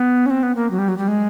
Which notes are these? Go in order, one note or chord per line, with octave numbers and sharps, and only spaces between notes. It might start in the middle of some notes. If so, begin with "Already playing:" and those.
Already playing: B3
C#4
C4
B3
A#3
F#3
G3
F#3
G3
G#3